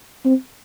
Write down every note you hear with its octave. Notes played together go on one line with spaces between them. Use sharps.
C4